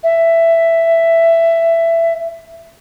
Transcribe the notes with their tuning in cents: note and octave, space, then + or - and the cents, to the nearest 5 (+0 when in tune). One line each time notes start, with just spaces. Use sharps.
E5 +10